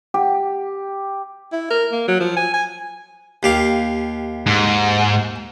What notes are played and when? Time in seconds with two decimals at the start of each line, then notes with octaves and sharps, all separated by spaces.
0.14 G4
1.52 E4
1.70 A#4
1.92 A#3
2.08 F#3
2.20 F3
2.36 G#5
2.54 G#5
3.43 D#2 G4 F5
4.47 G#2